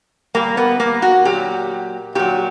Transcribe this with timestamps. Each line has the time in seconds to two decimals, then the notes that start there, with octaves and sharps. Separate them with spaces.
0.34 A#2 G3 A#3
0.57 B3
0.80 A#3
1.02 F#4
1.25 A#2 F#3 G4
2.15 A#2 F#3 G4